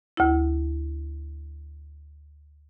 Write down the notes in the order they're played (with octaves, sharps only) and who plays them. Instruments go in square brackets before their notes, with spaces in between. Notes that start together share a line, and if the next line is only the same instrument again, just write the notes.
[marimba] D2 E4